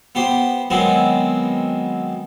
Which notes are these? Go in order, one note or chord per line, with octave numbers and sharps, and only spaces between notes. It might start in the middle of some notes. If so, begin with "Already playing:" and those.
B3 G4 C5
D#3 F#3 G#3 B3 C4